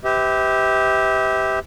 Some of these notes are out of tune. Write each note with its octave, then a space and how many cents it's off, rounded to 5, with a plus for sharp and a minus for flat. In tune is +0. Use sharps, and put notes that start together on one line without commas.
G4 +0 B4 +35 E5 -35